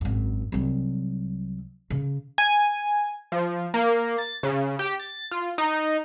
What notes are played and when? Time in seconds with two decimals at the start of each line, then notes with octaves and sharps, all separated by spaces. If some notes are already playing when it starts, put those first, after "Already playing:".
0.01 G#1 F#2
0.52 C2 F#3
1.90 C#3
2.38 G#5
3.32 F3
3.74 A#3
4.18 A6
4.43 C#3
4.79 G4
5.00 A6
5.31 F4
5.58 D#4